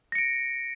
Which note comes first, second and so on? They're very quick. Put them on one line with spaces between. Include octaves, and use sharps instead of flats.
A#6 C#7 D7